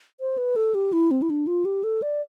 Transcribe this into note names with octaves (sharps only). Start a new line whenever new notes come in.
C5
B4
A4
G4
E4
C4
E4
D4
F4
G4
A4
D5